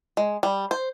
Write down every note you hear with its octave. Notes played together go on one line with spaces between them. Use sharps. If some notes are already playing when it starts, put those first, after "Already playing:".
G#3
G3
C5